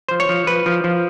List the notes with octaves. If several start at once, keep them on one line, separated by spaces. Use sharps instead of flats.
F3 C5
C#5
F3
F3 B4
F3
F3